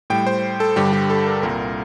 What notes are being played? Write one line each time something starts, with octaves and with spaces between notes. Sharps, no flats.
A2 G3 G5
C5
A4
G2 D3 G3 G4
G4
A4
A#4
C2 A#2 G3 A#4